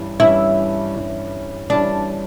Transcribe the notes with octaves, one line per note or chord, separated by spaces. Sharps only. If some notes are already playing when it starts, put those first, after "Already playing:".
Already playing: G2 E3 G3 C#4
G2 E3 G3 C#4 E4
G2 E3 G3 C#4
E3 G3 C#4 D4